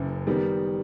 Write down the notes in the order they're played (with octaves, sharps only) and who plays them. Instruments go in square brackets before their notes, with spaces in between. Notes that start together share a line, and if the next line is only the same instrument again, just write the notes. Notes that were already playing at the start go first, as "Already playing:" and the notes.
Already playing: [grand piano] F#1 F#2 E3
D#3 G3 B3